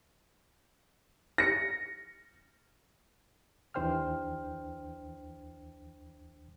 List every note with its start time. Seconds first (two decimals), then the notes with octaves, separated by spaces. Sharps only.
1.38 A#6 C#7
3.74 D#2 E3 D4 C5 G5 F6